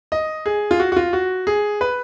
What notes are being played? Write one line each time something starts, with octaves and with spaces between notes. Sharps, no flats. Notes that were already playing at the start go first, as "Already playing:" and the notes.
D#5
G#4
F4
F#4
F#4
F4
F#4
G#4
B4